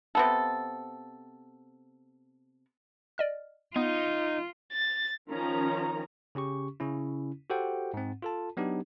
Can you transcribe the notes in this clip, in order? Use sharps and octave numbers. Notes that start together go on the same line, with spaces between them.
C3 B3 A4
D5 D#5 F6
B3 D#4 F4
A6
D#3 F3 C#4 A#5
C#3 C#4 G4 C#6
C#3 C#4 E4
F#4 G4 A4 C5 F#5 G5
G#2 C4
F4 A4 A5
F#3 B3 D4 D#4 G4